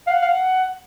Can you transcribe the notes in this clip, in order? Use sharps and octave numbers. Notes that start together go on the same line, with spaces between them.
F5 F#5
F5